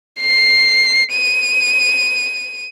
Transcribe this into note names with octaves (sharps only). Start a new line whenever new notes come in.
C7
D#7